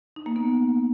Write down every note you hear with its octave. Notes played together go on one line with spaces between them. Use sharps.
D#4
A#3
B3